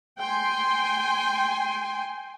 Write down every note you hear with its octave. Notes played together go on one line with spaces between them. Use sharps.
G5 G#5 C6